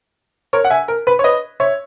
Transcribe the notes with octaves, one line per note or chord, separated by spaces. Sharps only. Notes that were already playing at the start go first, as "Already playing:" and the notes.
A#4 C#5
F#5
E5 G#5
A#4
B4
C#5
B4 D#5
C#5 E5